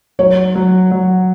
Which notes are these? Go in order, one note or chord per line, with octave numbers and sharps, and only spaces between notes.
F#3 C#5
F#3
F#3